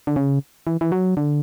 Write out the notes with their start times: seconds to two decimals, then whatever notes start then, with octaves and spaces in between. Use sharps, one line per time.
0.07 D3
0.16 C#3
0.67 E3
0.81 E3
0.92 F#3
1.17 D3